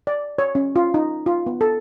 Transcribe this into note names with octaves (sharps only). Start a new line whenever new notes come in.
D5
C#5
C#4
F4
D#4
F4
B3
A4